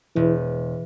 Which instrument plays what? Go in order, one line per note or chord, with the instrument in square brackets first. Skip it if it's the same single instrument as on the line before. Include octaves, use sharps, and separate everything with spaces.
[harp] E1 [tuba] E3